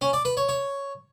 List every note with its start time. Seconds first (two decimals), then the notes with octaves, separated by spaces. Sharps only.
0.01 C#4
0.13 D5
0.25 B4
0.37 C#5
0.49 C#5